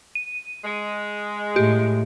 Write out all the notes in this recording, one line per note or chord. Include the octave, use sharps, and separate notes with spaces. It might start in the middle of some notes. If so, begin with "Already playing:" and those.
D#7
G#3
A2 G4